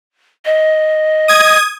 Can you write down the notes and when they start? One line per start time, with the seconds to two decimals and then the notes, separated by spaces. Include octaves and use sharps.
0.46 D#5
1.28 D#6 G#6